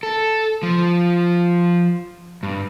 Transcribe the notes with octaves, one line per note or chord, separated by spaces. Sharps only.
A4
F3
G2